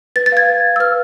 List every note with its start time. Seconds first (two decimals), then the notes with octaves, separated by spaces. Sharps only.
0.16 B4 A6
0.26 A6
0.32 F5 G#6
0.47 B4
0.64 F5
0.76 E6
0.80 B4 F6